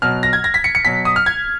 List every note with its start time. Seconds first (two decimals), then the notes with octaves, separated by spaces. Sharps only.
0.02 B2 F#3 F6
0.23 A#6
0.33 G#6
0.44 A#6
0.54 B6
0.64 C#7
0.75 C#7
0.85 B2 F#3 B6
1.05 D#6
1.16 F6
1.26 G#6